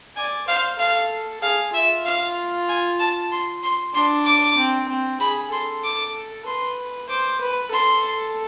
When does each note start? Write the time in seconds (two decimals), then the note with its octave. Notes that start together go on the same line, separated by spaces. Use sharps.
0.16 D5 G#5
0.48 C5 F5
0.79 A4 F5
1.42 G#4 F5
1.74 F4 E5
2.05 F5
2.68 G#5
2.99 A5
3.31 C6
3.63 C6
3.94 D4 C6
4.26 D6
4.57 C4
4.89 C4
5.20 G#4 B5
5.52 A4 C6
5.84 D6
6.46 B4 C6
7.09 C5 D6
7.41 B4
7.72 A4 C6